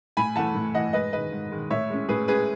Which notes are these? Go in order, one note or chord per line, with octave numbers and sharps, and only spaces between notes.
A2 G#5 B5
E3 A3 F#5 A5
A2
E3 A3 D#5 F#5
G#2 B4 D#5
D#3 G#3 B4 D#5
G#2
D#3 G#3
A2 C#5 E5
G#3 C#4
A2 G#4 B4
G#3 C#4 G#4 B4